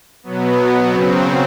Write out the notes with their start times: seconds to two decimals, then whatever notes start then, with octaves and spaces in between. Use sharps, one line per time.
0.23 B2 F#3 B3
0.89 C#3 F#3 C4